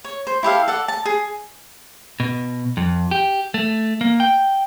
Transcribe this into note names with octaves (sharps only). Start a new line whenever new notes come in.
C#5
C5
E4 G4 A4 F5
A4 D5 F#5
A5
G#4
B2
F2
G4
A3
A#3
G5